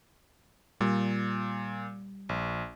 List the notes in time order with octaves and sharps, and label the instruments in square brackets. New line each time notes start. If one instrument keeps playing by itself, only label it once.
[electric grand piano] A#2 [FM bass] G3
[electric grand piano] A#1